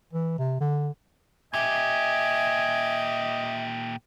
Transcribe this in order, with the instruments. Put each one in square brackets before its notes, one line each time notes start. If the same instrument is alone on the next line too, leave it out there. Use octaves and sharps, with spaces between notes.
[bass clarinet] E3
C3
D3
[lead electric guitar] A#2 G4 [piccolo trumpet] D#5 [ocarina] E5 [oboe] G#5